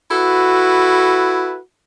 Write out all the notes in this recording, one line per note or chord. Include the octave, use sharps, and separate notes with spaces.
E4 F#4 A4 B4